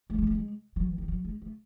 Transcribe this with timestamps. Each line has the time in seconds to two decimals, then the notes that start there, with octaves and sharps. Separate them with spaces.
0.10 A3
0.18 G#3
0.27 A3
0.35 G#3
0.76 F#3
0.87 E3
0.98 D#3
1.08 F#3
1.25 G#3
1.42 A3